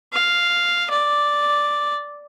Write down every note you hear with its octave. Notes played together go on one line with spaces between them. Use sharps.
F5
D5